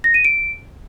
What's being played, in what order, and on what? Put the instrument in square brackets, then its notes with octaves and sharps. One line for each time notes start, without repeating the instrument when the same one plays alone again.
[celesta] A#6
D#7
D7